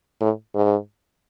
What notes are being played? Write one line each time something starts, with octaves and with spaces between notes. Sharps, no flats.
A2
G#2